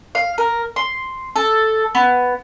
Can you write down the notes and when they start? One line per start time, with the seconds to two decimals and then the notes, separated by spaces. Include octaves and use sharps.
0.15 F5
0.38 A#4
0.76 C6
1.36 A4
1.95 B3